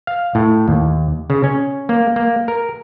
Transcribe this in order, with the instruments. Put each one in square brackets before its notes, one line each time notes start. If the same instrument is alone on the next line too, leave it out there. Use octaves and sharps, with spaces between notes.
[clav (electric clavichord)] F5
A2
D#2
C#3
C#4
A#3
A#3
A#4